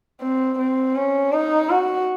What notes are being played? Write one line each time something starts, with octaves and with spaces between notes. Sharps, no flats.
C4
C4
C#4
D#4
F#4